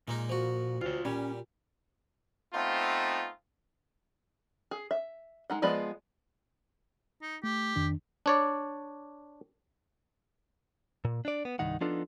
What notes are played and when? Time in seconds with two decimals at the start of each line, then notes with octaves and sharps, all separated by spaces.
0.08 A#2 G#3 A#3 D#4
0.29 F3 F#4
0.81 D2 F4 C#5
1.05 A#2 G3 C#4
2.54 A3 B3 C4 D#4 F4 F5
4.71 G#4
4.91 E5
5.50 G#3 D#4 F#5
5.62 F3 G#3 B3 D5 B5
7.22 D#4
7.44 A3 G4
7.76 F2 D#3 D4
8.26 D4 C#5 D5
11.05 A#2
11.25 D4 D5
11.45 B3
11.59 C2 G2 D#3 D#4 F#5
11.81 F3 B3 D4 D#4 F4 A4